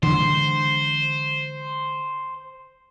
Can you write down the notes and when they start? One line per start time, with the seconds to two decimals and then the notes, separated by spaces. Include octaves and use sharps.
0.03 D3 E3 G#3 C5